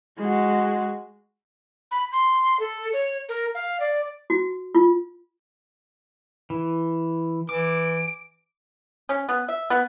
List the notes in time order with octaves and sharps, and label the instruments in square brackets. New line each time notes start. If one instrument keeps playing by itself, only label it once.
[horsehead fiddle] G#3 F#4
[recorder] B5
C6
A4
C#5
A#4
F5
D5
[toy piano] F#4
F4
[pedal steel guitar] E3
[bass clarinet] E3 [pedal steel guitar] D6 [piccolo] D7
[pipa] C#4
B3
E5
B3